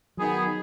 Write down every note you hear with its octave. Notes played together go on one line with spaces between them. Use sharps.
D#3 F#3 B3 G#4